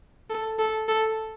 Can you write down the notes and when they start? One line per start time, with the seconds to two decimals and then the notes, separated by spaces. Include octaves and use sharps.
0.30 A4
0.59 A4
0.89 A4